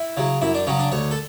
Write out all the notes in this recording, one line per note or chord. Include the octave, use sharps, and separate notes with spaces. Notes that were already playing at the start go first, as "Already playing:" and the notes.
Already playing: E4
C#3 F#3
F#2 E4
D4
C#3 F#3 C#4
D4
D2 C#5
A4